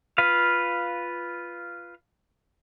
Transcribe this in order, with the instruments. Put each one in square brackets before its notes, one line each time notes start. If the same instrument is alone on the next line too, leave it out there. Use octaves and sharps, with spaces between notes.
[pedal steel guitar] F4 B4 F5